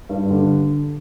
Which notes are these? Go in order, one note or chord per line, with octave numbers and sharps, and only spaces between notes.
G2
D3